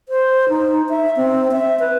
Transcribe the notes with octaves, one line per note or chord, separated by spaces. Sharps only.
C5
D#4
E5
C4
E5
B4